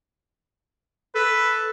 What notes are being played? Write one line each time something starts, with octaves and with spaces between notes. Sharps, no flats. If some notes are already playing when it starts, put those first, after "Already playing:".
A4 B4